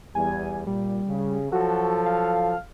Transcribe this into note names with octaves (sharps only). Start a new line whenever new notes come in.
E2 G3 G#5
A#2 G3
C#3
F3 F#3 F#4 A4
F5